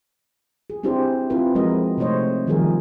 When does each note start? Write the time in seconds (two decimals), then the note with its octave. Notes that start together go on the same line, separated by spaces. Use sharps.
0.70 G#4
0.83 C4 D4 E4 G4 G#4 C5
1.30 C4 E4 F4 B4
1.55 F3 G#3 C4 F#4 A#4 D#5
1.98 C3 A3 D#4 C5 C#5 D#5
2.47 D#3 F3 G3 G#4 A#4